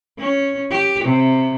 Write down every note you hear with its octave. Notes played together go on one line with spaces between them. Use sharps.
C#4
G4
C3